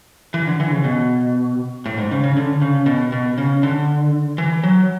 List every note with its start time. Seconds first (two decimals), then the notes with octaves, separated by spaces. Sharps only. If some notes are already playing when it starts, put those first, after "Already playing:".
0.34 E3
0.47 D3
0.60 E3
0.71 C#3
0.84 B2
1.86 A2
1.98 G#2
2.11 C#3
2.24 C#3
2.37 D3
2.62 C#3
2.86 B2
3.12 B2
3.38 C#3
3.63 D3
4.38 E3
4.64 F#3